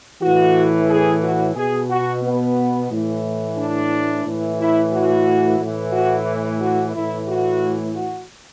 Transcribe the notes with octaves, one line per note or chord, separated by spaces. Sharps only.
A2 E3 F#4
G#4
F#4
B2 G#4
F#4
B3
A2 E3
D4
A2 E3
E4
F#4
A2 E3
F#4
F#4
A2 E3 E4
F#4
F#4